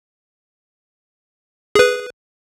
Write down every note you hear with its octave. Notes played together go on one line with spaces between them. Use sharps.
G#4 B4